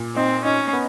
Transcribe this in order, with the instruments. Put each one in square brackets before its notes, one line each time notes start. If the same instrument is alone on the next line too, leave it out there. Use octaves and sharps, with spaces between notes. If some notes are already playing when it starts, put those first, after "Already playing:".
Already playing: [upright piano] A#2
[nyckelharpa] C4 [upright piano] D#4
[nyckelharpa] C#4 [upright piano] D#4
[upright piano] B3